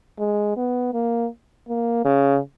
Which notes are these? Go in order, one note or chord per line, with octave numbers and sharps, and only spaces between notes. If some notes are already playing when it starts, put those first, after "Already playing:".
G#3
B3
A#3
A#3
C#3